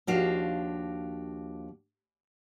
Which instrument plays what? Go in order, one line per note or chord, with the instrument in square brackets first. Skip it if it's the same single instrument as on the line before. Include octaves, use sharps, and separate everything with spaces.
[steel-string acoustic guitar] D#2 F3 D4 F#4 G4 F5